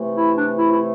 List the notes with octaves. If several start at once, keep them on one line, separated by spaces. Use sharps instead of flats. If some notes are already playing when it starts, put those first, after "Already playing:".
Already playing: C3 E3 A3
E4
D4
E4
E4